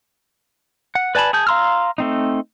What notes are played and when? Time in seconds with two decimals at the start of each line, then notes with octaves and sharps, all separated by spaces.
0.95 F#5
1.15 B4 D5 G#5 A5 B5
1.33 G#4 A5 G6
1.47 F5 A#5 C6 E6 F6
1.98 A3 C4 D#4